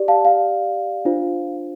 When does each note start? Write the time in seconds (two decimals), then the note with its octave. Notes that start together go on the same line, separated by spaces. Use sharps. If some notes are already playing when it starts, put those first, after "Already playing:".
Already playing: G4 D5
0.08 F5 A5
0.25 F5
1.05 D4 F4 C5